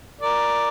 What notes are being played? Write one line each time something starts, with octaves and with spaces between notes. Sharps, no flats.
A#4 D5